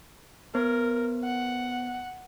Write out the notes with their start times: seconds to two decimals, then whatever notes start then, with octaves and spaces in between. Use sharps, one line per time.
0.55 B3 A#4 C5
1.25 F#5